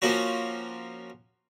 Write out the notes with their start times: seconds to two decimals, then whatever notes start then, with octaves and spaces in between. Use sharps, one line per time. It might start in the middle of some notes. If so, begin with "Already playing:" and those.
0.02 F3 A#3 C#4 F#4